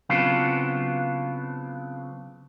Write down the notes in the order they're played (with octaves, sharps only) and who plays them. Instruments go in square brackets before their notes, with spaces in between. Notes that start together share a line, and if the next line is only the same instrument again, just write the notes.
[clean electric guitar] C#3 F#3 B3 C4 D4 F4